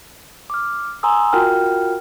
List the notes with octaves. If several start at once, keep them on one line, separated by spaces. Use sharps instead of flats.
D6 F6
G#5 A#5 C6 D#6 E6
F4 F#4 A#4 G5 F6